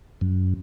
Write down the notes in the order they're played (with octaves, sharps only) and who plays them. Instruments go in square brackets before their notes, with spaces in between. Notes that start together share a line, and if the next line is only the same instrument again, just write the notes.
[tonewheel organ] F#2